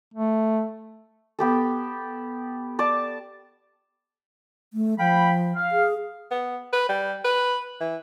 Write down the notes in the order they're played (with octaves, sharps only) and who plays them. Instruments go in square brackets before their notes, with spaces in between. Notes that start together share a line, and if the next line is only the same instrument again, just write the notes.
[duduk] A3
[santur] B3 G4 A4
D5 A5
[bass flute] A3
[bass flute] F3 [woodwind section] F5 G5 B5
[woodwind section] F5
[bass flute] G#4
[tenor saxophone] B3
B4
G3
B4
E3